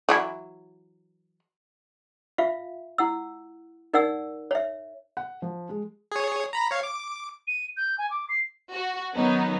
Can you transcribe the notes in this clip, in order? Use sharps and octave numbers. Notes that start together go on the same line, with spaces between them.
E3 F#3 E4
F4 E5 F5
E4 F#5 E6
D#4 A#4 D5 F#5 G#5 E6
C#5 E5
F#5
F3
G#3
G#4 C#5
A#5 B5
C#5 F5
D6
D#7
G6
G#5
D6
C7
F#4
D#3 F#3 B3 C#4 D#4